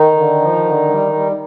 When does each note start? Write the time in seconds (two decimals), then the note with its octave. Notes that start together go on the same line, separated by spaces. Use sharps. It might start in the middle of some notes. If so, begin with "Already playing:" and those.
Already playing: D#3 D#4
0.16 D3
0.41 F3
0.65 D3
0.89 G3
1.13 G3